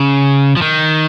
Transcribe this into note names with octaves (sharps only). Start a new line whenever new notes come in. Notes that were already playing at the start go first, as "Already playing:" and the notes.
Already playing: C#3
F3
D#3